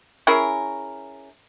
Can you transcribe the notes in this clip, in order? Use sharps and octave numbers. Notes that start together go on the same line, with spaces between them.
C#4 E4 G#4 A#4